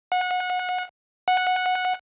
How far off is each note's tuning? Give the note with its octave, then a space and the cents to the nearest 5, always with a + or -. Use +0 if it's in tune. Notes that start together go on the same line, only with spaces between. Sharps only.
F#5 -25
F#5 -10